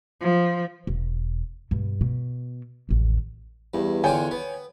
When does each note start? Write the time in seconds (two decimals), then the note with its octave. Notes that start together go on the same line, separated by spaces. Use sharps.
0.21 F3
0.87 E1
1.71 G2 B2
2.01 B2
2.89 A1 D#2
3.74 E2 G2
4.04 D3 D4 F4 C#5 G5 G#5
4.31 B3